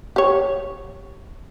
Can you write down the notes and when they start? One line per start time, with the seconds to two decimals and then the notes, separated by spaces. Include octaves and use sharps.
0.16 G4 C#5